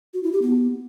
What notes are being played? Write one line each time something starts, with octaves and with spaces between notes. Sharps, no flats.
F#4
E4
G4
B3